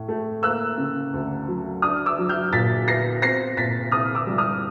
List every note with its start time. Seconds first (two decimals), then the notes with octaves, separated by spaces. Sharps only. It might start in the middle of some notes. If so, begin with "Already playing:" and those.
Already playing: A2
0.08 A3
0.43 A#3 E6 F#6
0.78 C#3
1.14 D2
1.48 F#3
1.82 D4 D#6 F6
2.06 D6 E6
2.18 F#3
2.29 F6 G6
2.53 A#2 A6 B6
2.87 B3 A#6 C7
3.22 C4 A#6 C7
3.57 A#2 A6 B6
3.91 C2 D#6 F6
4.15 D6 E6
4.27 G3
4.38 D#6 F6